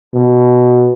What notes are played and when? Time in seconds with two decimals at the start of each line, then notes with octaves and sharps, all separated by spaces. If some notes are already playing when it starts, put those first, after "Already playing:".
0.14 B2